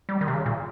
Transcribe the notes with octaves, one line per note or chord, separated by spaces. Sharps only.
G3
D#3
C3
C#3
A#2